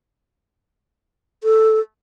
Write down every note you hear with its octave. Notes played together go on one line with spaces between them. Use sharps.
A4